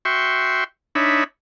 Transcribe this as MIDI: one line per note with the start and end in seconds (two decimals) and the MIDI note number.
0.05 0.64 66
0.05 0.64 76
0.05 0.64 79
0.05 0.64 84
0.05 0.64 85
0.95 1.24 62
0.95 1.24 63
0.95 1.24 73
0.95 1.24 76
0.95 1.24 83